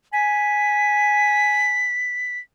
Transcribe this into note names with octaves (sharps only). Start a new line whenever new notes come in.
G#5 B6